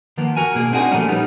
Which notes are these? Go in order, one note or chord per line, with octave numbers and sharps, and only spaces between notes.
D#3 F3 A#3 B3
F#4 A#4 G#5
B2 A#3 G#4
C4 D4 D#4 F#4 G#4
A#2 F3 G3 A3 A#3 C#4
G3 B3 D#4